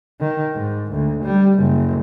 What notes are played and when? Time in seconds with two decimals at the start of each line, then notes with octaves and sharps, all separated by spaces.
0.20 D#3
0.53 G#2
0.92 D2
1.23 G3
1.59 F#1